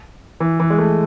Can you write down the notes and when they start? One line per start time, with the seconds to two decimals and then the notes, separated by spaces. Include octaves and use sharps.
0.40 E3
0.60 E3
0.70 G#3
0.79 A3